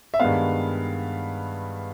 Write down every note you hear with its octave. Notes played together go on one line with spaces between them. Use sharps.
E5
G2 D#3 G#3 B3 F5